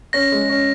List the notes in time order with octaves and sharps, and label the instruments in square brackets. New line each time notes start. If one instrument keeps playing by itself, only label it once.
[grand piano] C#4 [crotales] A#6
[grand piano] G#3
C#4